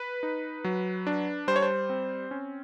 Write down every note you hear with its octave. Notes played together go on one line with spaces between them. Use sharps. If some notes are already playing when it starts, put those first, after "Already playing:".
Already playing: B4
D#4
F#3
D4
G3 C5
C#5
C5
C4
C#4